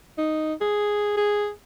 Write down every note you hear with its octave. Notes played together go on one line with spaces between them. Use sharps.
D#4
G#4
G#4